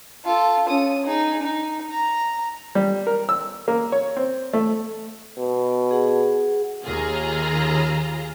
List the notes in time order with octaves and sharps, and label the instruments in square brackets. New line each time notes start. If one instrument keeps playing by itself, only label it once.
[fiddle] F4 A4
C#4 D#6
D#4 G#4
D#4
A#5
[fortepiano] G3
A#4
E6
A#3
C#5
C4
A3
[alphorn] B2
[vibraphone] G#4 F#5
[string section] D#2 F4 G#4 A#5